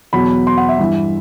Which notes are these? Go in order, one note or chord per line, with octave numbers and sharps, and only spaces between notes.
E2 B2 F#3 B5
C6
F#5
E5
G2 E3